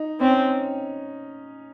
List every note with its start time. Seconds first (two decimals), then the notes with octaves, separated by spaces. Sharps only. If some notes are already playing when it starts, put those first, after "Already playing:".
Already playing: D#4
0.20 C4 C#4